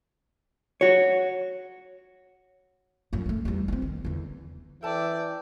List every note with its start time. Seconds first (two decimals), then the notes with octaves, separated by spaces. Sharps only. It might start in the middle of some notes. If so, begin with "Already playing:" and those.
0.81 F#4 C#5
3.13 A#1 F#2
3.26 A3 B3
3.45 E2 G3
3.68 C4 D#4
3.82 D#3
4.05 E2 D3
4.83 E3 A4 D5 E5 G5 A5